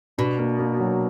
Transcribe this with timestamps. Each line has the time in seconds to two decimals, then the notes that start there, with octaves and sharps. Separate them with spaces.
0.18 B2 D4
0.39 A#3
0.59 A#3
0.80 F#3